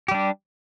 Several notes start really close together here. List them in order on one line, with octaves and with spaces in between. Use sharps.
G4 G3 D4